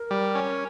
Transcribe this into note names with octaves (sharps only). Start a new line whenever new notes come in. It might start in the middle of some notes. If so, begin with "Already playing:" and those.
Already playing: A#4
G3
C#4